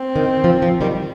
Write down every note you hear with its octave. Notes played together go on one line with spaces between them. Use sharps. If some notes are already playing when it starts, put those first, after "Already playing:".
Already playing: C4
D#3
F3
F3
D#3 G3